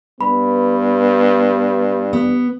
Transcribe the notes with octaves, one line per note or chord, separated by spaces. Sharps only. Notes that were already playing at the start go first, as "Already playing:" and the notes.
G2 B3 B5
B3